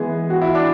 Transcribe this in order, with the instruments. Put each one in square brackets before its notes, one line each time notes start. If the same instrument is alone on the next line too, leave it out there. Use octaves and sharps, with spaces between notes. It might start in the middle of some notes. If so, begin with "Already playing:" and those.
Already playing: [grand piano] E3 G#3 B3 [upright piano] G#4
[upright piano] F#4
E4
D4